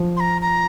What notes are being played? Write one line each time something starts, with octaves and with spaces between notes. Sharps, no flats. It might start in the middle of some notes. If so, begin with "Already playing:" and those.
Already playing: F3
C6
A#5
A#5